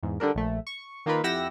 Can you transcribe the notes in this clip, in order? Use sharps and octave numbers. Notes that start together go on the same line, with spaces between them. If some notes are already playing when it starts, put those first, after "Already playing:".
E2 G#2
D3 G3 D4 A#4
A#1 A3
C#6
D#3 A#3 D#4 F4 A#4 B4
F2 E4 G4 F#5 E6 A#6